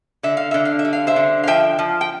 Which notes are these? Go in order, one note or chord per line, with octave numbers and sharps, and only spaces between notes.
D3 E5
F5
D3 E5
F5
E5
G3
F5
C5 E5
D3
F5
F3 E5 G5
F3
G5